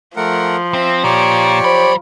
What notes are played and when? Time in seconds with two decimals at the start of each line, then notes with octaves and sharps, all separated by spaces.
0.16 F3 A3 A#4 F#5
0.74 C4 E5
1.04 A#2 G4 C#5 D5
1.64 F#3 C5 B5